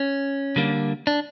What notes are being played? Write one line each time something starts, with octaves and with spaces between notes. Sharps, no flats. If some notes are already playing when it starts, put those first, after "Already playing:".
Already playing: C#4
D3 G3 A#3
D4